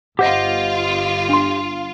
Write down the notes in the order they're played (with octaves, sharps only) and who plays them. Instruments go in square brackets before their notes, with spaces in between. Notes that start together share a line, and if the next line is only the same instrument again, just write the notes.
[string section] G1 F4 [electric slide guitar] G4 C5 D#5 [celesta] F#5
[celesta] D4 C6